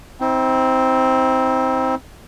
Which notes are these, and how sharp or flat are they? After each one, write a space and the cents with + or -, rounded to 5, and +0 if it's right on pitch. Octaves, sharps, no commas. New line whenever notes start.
C4 +0 D#4 +45